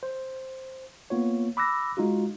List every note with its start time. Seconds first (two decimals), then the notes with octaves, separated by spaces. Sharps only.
0.03 C5
1.10 A#3 B3 F4 C#5
1.57 B5 D6 E6 F#6 A#6
1.97 G#3 D#4 F4 F#4